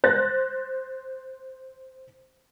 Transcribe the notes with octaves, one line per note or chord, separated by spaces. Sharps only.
C5 F#6 A6 A#6